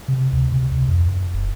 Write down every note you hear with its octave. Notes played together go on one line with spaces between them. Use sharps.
C3
D2
C3
D2
F2
F#2
F1